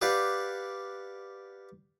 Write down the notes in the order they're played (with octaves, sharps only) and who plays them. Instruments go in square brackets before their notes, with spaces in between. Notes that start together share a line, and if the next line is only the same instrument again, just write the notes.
[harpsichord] G4 B4 D5 F5 F#5